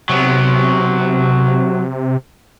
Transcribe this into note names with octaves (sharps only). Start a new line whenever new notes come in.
C3 F#3 B3